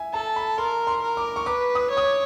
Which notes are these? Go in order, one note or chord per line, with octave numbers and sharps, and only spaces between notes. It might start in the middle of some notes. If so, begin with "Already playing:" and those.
Already playing: E5 G#5
A4 A5
B5
A#4 C6
C6
A#4
D6
C#6
B4 D6
D#6
C#5
D#6
D6